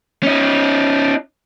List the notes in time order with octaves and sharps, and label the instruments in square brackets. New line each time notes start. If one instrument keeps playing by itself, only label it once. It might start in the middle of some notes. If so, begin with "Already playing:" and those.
[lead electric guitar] C#4 D#4